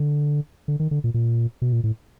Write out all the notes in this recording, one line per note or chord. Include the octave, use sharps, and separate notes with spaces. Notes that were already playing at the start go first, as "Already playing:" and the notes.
Already playing: D3
D3
D#3
D3
A#2
A#2
B2
A#2
A2